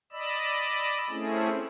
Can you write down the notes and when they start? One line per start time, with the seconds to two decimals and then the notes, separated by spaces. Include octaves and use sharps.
0.12 D5 D#5 B5 E6
1.10 A3 C4 C#4 E4 G#4